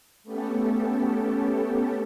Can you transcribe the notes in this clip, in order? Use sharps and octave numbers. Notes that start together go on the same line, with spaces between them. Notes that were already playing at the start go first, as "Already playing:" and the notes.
A3 B3 C#4 G4 A4